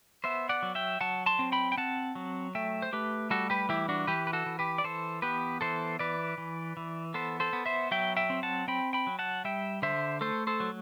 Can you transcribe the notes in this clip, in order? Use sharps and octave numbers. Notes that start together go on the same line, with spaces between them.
B3 C5 E5
D5 F#5
F#3
E5 G5
F#3 F#5 A5
A5 C6
C4
G5 B5
G5
C4 F#5 A5
F#3
A3 E5 G5
C5
A3 G4 B4
G3 F#4 A4
G4 B4
E3 E4 G4
D4 F#4
E3 G4 B4
B4
F#4 A4
E3
G4 B4
D5
E3 A4 C5
B3 G4 B4
E3 A4 C5
E3 B4 D5
E3
E3
B3 A4 C5
A4 C5
B3
C5 E5
F#3 E5 G5
E5 G5
C4
F#5 A5
C4 G5 B5
G5 B5
F#3
F#5 A5
G3 E5 G5
D3 C5 E5
A3 A4 C5
A4 C5
F#3